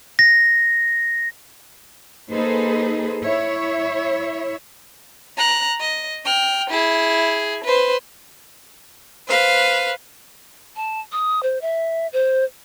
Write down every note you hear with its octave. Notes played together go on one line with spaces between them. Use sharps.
A#6
A#3 D#4 G#4 A4 B4 C5
E4 C#5 E5
A#5 F#6
D#5
G5 F6
E4 G#4
B4 C5
B4 C5 F5
A5
D#6
C5
E5
C5